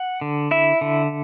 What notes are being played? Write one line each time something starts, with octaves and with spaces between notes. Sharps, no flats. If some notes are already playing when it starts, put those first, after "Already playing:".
Already playing: F#5
D3
E4 E5
D3